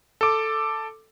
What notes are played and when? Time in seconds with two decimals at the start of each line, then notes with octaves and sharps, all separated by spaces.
0.21 A4 D6